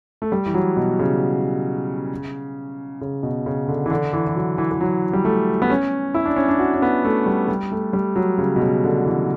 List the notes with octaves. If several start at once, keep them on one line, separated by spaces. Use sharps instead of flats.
A3
G3
E3
F#3
B2
C#3
C#3
B2
C#3
D3
E3
D3
E3
E3
F#3
E3
E3
F#3
G3
A3
B3
C#4
E4
D4
C#4
D4
F#4
C#4
B3
A3
G3
G3
A3
G3
F#3
C#3
B2
C#3
D3
E3